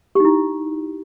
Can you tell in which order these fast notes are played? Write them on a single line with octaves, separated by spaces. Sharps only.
G4 D#4 E4